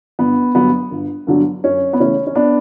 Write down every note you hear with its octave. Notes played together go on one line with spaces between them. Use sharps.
G1 B3
G2 D3 F#3 B3
G1
G2 D3 F#3 B3
F#2 C#4
B3
C#3 E3 A3 C#4
C#4
B3 D4